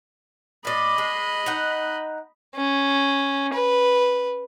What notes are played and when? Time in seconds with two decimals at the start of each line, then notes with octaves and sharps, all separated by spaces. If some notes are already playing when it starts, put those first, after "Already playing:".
0.65 A2 D5 D#5 B5
0.98 G#3
1.46 D#4 F#5
2.56 C#4
3.54 B4